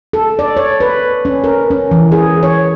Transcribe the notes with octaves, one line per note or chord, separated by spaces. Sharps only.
A4
D5
C#5
B4
C#4
A#4
C#4
E3
G#4
C#5